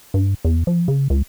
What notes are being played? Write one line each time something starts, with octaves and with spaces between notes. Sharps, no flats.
G2
E2
F3
C#3
C#2